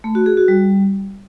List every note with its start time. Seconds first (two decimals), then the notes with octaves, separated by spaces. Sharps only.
0.04 A3
0.15 F#4
0.26 G#4
0.37 F#4
0.48 G3